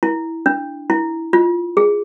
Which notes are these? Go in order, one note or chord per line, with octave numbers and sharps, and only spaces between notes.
E4
D4
E4
F4
G#4